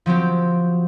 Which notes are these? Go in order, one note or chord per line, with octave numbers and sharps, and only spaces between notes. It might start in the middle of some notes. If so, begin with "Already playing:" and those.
F3 F#3 C4 G4